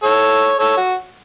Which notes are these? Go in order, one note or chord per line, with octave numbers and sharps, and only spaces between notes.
A4 C#5
A4 C#5
F#4